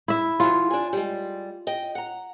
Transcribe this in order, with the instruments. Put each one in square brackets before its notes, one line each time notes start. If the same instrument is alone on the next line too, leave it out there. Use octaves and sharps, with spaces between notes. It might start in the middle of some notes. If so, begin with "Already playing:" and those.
[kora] E4 E5
[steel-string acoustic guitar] E3 F#3 [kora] F4
[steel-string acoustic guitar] D4 G#5
G3 G#3
D#5 G5
F#5 A#5